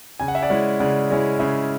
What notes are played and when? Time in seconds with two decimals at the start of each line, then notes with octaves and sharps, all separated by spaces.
0.20 C#3 G#5
0.28 F#5
0.35 E5
0.43 D5 F#5
0.50 G#3 C#4 E4
0.80 C#3 D5 F#5
1.10 G#3 C#4 E4
1.39 C#3 E5